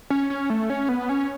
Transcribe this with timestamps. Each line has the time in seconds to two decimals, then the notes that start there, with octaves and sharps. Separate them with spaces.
0.10 C#4
0.30 C#4
0.50 A3
0.70 C#4
0.89 B3
1.09 C#4